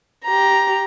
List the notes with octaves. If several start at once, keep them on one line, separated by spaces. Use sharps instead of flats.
G4 A#5